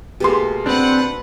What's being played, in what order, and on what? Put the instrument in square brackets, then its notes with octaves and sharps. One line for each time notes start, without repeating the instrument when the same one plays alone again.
[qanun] B2 A3 A#3 [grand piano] G4 G#4 C6
[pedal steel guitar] C4 D4 [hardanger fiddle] B4 F#5